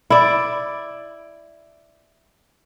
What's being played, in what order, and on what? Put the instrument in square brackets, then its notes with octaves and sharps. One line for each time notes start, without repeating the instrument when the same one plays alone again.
[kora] E4 D5